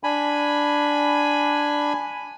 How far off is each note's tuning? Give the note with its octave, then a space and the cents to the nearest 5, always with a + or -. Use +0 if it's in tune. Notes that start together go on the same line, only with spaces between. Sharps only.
D4 +0 G#5 +0 B5 +0